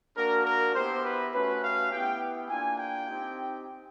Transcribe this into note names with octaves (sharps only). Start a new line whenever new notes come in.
A#3 D4 F#4 A#4
A#4
B3 E4 G4 C5
B4
A3 C#4 F#4 B4
F5
B3 E4 G4 G5
A#3 D4 F4 G#5
G5
C4 D#4 G4